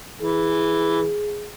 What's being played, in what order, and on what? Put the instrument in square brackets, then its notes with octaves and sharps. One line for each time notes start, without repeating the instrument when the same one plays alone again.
[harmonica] E3 [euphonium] G#4